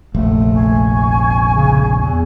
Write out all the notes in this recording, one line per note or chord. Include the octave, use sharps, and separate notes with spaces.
F1 A#1 A3
G#5 C#6
C#3
E2